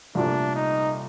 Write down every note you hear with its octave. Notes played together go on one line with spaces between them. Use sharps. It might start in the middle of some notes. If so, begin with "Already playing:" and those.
C2 A#2 F3 A3 D4
D#4